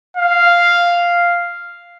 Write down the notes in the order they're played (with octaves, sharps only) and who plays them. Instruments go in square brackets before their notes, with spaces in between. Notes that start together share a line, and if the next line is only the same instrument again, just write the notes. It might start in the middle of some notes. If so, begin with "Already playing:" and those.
[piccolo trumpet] F5